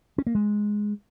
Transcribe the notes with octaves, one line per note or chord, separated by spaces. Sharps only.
C#4
A#3
G#3